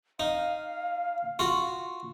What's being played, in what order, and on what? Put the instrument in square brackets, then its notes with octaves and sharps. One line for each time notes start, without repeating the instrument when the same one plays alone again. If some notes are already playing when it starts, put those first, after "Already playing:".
[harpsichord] D#4 [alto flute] F5
[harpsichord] F4 F#4